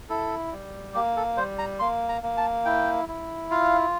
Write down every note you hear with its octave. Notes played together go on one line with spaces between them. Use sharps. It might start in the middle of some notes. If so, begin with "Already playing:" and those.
E4 A4
G3
A#3 G4
A4
G3 C5
A#5
A#3 C6
A#5
A#3
A5
E4 G5
E4
F4 F5